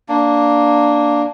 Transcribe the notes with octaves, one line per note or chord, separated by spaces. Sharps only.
A#3 D4